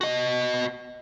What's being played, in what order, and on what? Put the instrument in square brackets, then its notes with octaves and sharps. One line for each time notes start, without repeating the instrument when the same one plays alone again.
[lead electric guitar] F#4 D#5